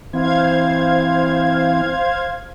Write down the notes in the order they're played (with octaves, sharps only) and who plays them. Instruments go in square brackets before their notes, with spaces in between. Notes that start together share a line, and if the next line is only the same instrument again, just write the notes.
[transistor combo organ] E3 C4 [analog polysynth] C5 F5 G#6